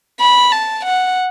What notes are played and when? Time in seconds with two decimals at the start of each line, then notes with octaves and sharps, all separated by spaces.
0.20 B5
0.52 A5
0.85 F#5